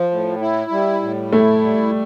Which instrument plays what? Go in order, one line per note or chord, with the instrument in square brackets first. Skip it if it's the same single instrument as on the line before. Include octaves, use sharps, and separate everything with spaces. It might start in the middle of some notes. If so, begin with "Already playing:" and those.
Already playing: [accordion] F3
A2
E4
G3
A2
[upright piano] A3 [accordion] E4
[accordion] G3